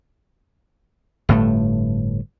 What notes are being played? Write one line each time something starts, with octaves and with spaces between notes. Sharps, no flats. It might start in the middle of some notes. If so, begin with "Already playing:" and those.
G1 A2 A3